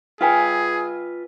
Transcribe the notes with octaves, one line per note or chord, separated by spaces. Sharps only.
F4 G#4 B4 F5 G5 G#5